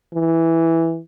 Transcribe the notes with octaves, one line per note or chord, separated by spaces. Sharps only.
E3